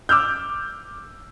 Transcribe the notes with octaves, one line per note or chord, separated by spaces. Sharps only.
D6 E6 F6 G6